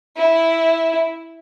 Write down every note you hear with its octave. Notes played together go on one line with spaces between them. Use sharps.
E4